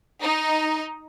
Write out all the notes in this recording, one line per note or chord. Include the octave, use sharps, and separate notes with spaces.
D#4